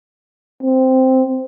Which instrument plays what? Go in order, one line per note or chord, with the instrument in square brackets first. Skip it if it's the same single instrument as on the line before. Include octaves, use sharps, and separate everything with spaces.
[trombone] C4